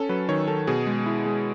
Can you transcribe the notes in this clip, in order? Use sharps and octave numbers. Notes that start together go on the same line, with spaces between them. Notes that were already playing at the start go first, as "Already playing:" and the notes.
Already playing: C#4 A4
F#3 B4
D#3 C#5
D#3 A4
B2 G#4
G#3
E4
G#3